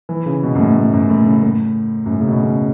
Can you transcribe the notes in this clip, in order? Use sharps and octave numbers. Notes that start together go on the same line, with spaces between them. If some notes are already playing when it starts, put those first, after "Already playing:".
E3
C#3
B2
F#2
A2
A2
F#2
A2
C#3
A2
F#2
A2
C#3
B2
C#3